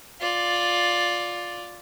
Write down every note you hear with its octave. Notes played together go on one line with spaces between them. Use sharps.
F4 D5